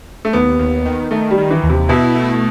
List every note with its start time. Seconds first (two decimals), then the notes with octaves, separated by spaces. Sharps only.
0.25 A3
0.33 D#2 B3
0.59 D#2
0.85 D#3
1.11 D#3 A3
1.31 G3
1.38 D#3
1.51 E3
1.63 D#2
1.69 C3
1.89 B2 E4
2.15 A3